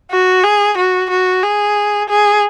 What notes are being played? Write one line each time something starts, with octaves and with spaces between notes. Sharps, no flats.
F#4
G#4
F#4
F#4
G#4
G#4